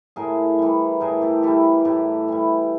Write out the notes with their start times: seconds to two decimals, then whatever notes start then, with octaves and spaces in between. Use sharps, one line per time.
0.16 A2 G#4 A#4
0.59 E3 G3
1.00 A2 G#4 A#4
1.22 G4 A4
1.43 E3 G3 G4 A4
1.85 A2 G4 A4
2.28 E3 G3